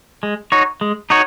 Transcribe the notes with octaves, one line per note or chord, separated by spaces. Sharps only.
G#3
D#4 F#4 C#5
G#3
D#4 F#4 C#5